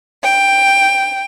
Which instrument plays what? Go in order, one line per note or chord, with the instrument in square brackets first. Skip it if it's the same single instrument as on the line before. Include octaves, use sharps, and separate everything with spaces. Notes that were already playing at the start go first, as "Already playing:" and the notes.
[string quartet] G5